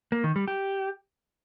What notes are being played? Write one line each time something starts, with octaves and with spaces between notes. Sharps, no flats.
A#3
D#3
G3
G4